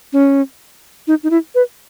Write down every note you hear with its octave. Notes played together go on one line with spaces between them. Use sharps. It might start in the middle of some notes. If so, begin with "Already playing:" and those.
C#4
D#4
D#4
E4
B4